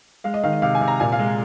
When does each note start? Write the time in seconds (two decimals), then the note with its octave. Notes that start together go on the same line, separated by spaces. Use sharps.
0.24 G#3 F5
0.34 D#5
0.43 D#3 F5
0.53 D#5
0.62 C3 F5
0.75 G#5
0.81 C3
0.88 A#5
1.00 A#2 G#5
1.12 F5
1.19 G#3